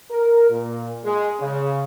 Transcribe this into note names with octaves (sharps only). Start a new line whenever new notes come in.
A#4
A#2
G#3
C#3